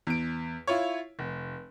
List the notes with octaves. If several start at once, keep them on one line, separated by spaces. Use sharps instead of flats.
E2 D7
E4 F4 C#5
F1